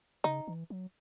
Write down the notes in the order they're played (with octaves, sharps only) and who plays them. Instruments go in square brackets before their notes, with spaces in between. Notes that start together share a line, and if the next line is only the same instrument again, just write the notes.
[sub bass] C#3 [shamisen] D#4
[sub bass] E3
F#3